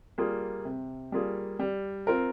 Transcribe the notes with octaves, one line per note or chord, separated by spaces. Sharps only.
G3 A#3 F4 G#4
C3
G3 A#3 F4 G#4
G3
C4 F4 A#4